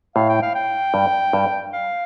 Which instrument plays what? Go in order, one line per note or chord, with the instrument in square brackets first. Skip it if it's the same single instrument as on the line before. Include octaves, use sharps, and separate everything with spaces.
[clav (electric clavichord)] A2 [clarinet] F5
[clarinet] G5
F5
G5
[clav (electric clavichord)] G2
G2
[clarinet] F5